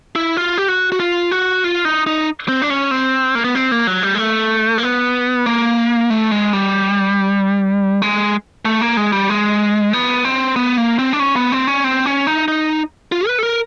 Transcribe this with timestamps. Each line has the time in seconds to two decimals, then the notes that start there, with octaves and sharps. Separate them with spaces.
0.16 E4
0.37 F4
0.58 G4
0.68 F#4
0.92 F#4
1.00 F4
1.31 F#4
1.64 F4
1.85 D#4
2.07 D#4
2.48 C4
2.62 D4
2.70 C#4
2.91 C4
3.35 A#3
3.44 B3
3.55 C4
3.72 A#3
3.87 F#3
4.03 G3
4.15 G#3
4.18 A3
4.78 A#3
4.83 B3
5.46 A#3
6.10 A3
6.31 G#3
6.53 G3
8.02 G#3
8.65 A3
8.81 A#3
8.97 G#3
9.12 G3
9.29 G#3
9.93 B3
10.25 C4
10.56 B3
10.78 A#3
10.99 C4
11.13 D4
11.20 C#4
11.36 B3
11.52 C4
11.67 C#4
11.84 C4
12.06 C#4
12.27 D#4
12.48 D#4
13.12 F4
13.27 B4
13.39 A4
13.43 A#4